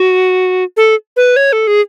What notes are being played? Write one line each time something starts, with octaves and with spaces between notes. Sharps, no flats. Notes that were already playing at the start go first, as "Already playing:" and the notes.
Already playing: F#4
A4
B4
C#5
A4
G#4